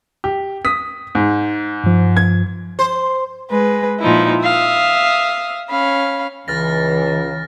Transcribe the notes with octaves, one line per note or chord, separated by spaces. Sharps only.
G4
D#6 B6
G#2
G2 F3
G#6
C5
G#3 B4
A#2 F3 D#4 E4
E5 F5 D#6
C#4 F5 B5
C#2 E3 F6 A6 A#6